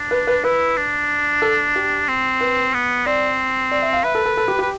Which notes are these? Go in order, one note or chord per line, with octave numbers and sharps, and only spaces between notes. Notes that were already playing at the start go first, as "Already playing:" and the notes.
Already playing: D4
B4
B4
E4 B4
D4
A4
G4
C4
B4
B3
C4 D5
D5
E5
F5
B4 E5
A4
A4
A4
G4
G4 B4